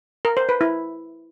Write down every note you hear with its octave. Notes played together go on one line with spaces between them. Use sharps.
A#4
C5
B4
E4